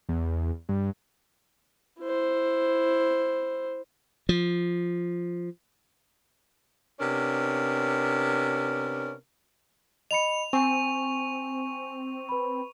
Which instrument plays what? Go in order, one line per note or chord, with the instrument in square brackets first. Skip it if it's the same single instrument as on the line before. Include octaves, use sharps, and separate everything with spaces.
[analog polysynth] E2
G2
[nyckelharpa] E4 C5
[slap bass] F3
[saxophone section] C3 B3 C#4 D4 A#4
[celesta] D#5 B5 C#7 [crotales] F7
[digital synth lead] C4 [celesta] G#5 [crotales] C#6
[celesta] B4 B5